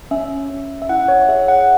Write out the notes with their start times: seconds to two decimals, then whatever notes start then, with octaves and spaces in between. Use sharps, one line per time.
0.11 C#4 E5
0.50 C#4
0.82 E5
0.89 E4 F#5
1.08 C#5
1.29 G#4 E5
1.48 F#5